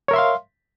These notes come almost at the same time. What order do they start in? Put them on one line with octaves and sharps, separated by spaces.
C#5 A#4 E5 C6 F5